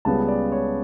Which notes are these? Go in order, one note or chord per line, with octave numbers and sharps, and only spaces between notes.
C#2 C#3 G3 B3 A5
D5
C#5